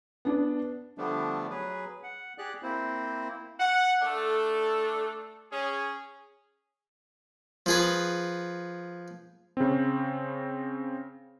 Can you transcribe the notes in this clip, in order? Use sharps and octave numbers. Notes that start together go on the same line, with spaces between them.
B3 D4
D3 F3 G3 A3 B3 D4
F#3 G#4 B4
F#5
G4 G#4 D5 F#6
A#3 C4 E4 C5
F#5
A3 D4 A4
C#4 G#4
F3 G#4 B4
C#3 C4